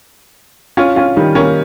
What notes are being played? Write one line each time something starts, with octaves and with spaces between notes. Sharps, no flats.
C#4 F4
C#4 F4
D#3 G3
A#3 C#4